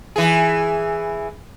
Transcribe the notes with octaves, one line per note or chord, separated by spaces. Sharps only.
E3 G#4